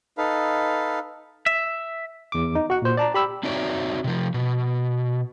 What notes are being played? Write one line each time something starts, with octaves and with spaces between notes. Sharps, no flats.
D#4 A4 B4 F5
E5
E2 D6
D#4
F#4 F#5
A#2 C5
D5 A5 A#5
G4 B5 E6
C4 D#4 F#4 C#5 D5 E5
C3 F3
B2